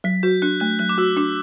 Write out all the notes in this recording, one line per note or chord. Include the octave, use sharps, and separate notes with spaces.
F#3 B6
F#4 G6
D4 F#6
A3 F#6
F#3 F#6
D6
F#4 E6
D4 D6